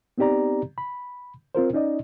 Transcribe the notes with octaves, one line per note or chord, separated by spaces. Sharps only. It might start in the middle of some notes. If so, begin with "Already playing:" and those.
B3 C4 D#4 G4 D5 A#5
B5
C4 F4 A#4 C5
C#4 D#4 D5 D#5